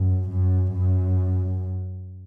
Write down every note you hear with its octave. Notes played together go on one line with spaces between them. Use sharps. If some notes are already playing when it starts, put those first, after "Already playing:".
Already playing: F#2
F#2
F#2